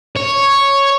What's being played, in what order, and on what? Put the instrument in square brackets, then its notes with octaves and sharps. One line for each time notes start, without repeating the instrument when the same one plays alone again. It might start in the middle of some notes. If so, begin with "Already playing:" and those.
[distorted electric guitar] C#5